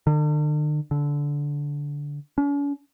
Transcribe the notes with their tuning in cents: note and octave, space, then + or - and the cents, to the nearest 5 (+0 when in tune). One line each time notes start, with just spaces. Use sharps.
D3 +45
D3 -15
C#4 +45